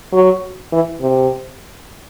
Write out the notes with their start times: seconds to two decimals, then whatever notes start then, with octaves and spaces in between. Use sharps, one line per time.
0.12 F#3
0.72 E3
1.01 C3